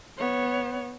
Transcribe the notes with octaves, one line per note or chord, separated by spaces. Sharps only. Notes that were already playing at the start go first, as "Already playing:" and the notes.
B3 C#5